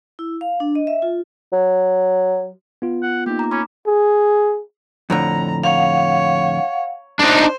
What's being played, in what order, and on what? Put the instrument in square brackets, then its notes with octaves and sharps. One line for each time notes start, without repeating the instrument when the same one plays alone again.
[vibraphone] E4
F5
D4
D#5
E5
F4
[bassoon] F#3
[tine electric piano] B3 F4
[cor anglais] F#5
[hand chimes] A#3 D#4 [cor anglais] G4
[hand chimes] A#5 D6
[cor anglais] C#4 [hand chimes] B5 D6
[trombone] G#4
[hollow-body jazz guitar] F2 A2 D3 [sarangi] A#5
[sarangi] C#5 [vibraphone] F5 F#5
[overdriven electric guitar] D4 D#4 [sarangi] C5